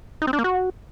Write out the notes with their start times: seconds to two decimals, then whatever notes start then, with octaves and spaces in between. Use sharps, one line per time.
0.22 D#4
0.27 C4
0.33 D4
0.39 A#3
0.44 F#4